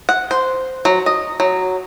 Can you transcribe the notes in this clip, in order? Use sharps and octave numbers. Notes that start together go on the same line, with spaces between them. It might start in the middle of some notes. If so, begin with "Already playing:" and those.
F#5
C5
F#3
D#5
F#3